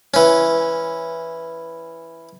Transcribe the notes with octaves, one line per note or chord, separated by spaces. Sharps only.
E3 C#4